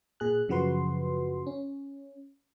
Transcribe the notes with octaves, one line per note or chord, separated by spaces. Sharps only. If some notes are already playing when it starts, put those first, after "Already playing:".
A#2 G#4 F#6
F#2 C#3 F3 F#4 B4 C6
C#4